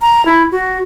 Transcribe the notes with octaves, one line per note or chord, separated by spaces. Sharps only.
A#5
E4
F#4